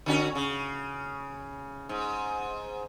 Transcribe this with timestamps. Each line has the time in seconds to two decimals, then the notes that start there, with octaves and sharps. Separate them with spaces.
0.06 D3 C#4 F#4
0.35 C#3
1.89 G#2